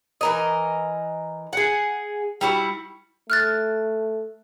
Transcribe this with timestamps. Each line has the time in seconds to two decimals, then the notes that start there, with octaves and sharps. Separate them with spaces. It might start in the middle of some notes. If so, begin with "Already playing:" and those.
0.21 E3 A#4 D#5
1.53 G#4 F#5
2.41 G3 E4 F#4
3.30 A3 F6 F#6 A6